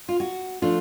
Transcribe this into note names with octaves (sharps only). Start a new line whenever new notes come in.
F4
F#4
F3 A3 D4 F4